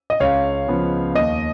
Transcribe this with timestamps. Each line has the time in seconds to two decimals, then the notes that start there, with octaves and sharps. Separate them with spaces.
0.10 D#5
0.20 C#2 C#5 F5
0.67 C#3 F3 B3
1.15 D#2 D#5